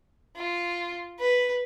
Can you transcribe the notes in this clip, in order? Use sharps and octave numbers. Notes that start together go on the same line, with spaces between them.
F4
B4